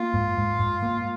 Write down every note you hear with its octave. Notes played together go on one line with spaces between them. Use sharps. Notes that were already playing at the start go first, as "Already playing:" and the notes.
Already playing: A#3 F4
G#2
G#2
G#2
A#3